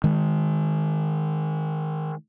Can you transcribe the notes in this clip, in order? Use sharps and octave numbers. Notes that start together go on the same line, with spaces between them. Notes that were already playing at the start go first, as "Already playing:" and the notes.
D#3 G#3